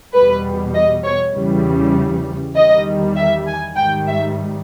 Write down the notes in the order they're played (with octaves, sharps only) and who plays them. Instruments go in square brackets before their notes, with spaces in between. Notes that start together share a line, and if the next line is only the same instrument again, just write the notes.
[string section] E2 B2 G3 B4
D#5
C#5
E2 C#3 E3 G3
E2 D#3 G3 D#5
E5
G#5
G#2 D#3 G3 G5
E5